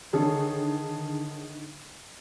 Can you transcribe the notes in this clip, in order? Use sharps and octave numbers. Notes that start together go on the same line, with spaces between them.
D3 D#3 G#4 A4 C#5